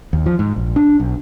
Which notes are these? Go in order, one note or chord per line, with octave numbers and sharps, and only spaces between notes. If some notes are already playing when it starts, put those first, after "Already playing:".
D#2
F3
G#2
A#1
D4
B1